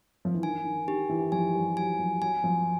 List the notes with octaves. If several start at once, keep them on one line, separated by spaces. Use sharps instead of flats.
F3
E3
D#3 G#5
D#3
D#3 G4
E3
F3 G#5
G3
F#3 G#5
F3
F#3 G#5
F3